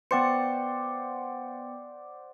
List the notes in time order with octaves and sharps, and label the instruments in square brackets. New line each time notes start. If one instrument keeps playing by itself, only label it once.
[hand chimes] B3 G5 C#7 [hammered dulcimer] C5 D5 F#5